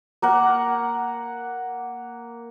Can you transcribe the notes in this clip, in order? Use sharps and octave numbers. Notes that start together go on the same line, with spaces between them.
A#3 A#4 F#5